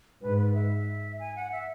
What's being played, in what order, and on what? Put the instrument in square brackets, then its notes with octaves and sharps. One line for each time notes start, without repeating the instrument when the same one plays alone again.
[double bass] G#2 [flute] B4
[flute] B4
E5
G#5
F#5
E5